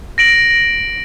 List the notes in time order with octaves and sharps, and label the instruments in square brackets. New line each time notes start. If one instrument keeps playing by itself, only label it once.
[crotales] A#6 D7 F#7